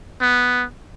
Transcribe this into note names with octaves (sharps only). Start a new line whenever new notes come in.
B3